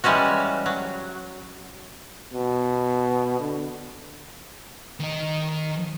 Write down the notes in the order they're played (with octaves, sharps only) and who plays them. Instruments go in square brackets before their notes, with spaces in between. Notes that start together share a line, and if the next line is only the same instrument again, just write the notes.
[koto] E3 G3 G#3 C#4 F#4
F#3
[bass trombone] B2
D3
[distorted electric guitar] D#3 D#5